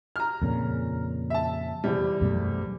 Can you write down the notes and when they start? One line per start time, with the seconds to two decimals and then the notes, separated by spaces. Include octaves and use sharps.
0.16 A#5 F6
0.42 F2 A#2 C#3
1.30 E5 A5
1.84 E2 C3 G3
2.21 F#2 B2 A3